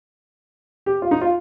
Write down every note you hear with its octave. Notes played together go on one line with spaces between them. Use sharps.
G4
F4
D#4
F4